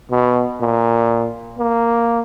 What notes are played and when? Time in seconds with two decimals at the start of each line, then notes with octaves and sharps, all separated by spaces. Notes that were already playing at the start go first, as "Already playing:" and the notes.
0.11 B2
0.61 A#2
1.59 A#3